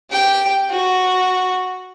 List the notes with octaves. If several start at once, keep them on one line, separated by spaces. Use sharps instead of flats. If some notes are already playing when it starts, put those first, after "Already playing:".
G4 G5
F#4